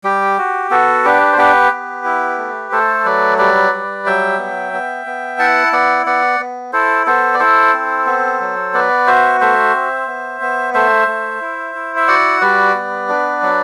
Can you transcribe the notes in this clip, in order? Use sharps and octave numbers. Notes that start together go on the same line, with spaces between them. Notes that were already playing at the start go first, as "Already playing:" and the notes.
G3 G4
F#4
B3 F#4 A4
D4 G4 B4
C5
B3 G4 B4
B3
E4
A3
A3 A4 C5
F#3 B4 D5
G3 B4 D5
G3
F#3 E5 G5
B3
B3
B3
E4 F#5 A5
B3 D5 F#5
B3 D5 F#5
B3
E4 A4 C5
B3 A4 C5
D5
E4 A4 C5
C4
B3
F#3
B3 B4 D5
F#4 C5 E5
A3 C5 E5
C4
B3
B3
A3 C5 E5
A3
E4
E4
E5
F#4 D5 F#5
G3 B4 D5
B3
D4
F#3